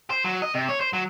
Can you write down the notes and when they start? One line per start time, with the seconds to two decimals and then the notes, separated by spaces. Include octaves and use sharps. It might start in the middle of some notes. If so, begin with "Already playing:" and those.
0.10 C5
0.24 F#3
0.42 D#5
0.54 C3
0.69 C#5
0.81 C5
0.93 F#3